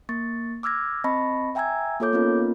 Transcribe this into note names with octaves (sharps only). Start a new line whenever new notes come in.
A#3 C#6 A6
D6 E6 F6 G#6 A#6
C4 D#5 A5 B5 C#6 A#6
E5 G5 G#5 A#5 E6 G#6
A#3 F4 A4 C#5 D6 G6
A#3 B3 C#4 D#4 F4 A#4